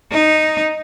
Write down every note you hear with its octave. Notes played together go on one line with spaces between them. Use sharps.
D#4